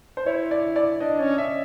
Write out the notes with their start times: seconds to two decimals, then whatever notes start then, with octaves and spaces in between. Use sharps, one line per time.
0.17 C5
0.26 E4 C#5
0.51 D5
0.76 D5
1.00 D4 D#5
1.20 C#4
1.38 E5